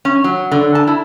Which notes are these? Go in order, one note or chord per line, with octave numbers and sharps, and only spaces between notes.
C#4
F#3
D3
A5
E4